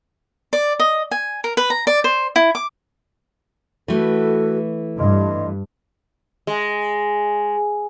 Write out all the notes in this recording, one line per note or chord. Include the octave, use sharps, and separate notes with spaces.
D5
D#5
G#5
A#4
B4
A#5
D5
C5
E4
D6
E3 A3 F#4 A4 B4
G2 D#5 C6
G#3